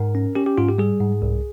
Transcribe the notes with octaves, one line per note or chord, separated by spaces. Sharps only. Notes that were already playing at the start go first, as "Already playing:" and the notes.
Already playing: G#2 A#4
C#4
C#4 G4
G4
G#2 F4
G4
G3 G#4
G#2
C2